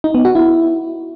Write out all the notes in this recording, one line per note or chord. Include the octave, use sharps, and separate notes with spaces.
D#4
B3
F#4
E4